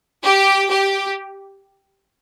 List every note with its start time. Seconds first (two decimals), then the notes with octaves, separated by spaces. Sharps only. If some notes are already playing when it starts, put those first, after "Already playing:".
0.23 G4
0.69 G4